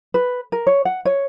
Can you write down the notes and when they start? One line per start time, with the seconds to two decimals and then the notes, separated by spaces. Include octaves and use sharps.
0.14 B4
0.52 A#4
0.67 C#5
0.85 F#5
1.05 C#5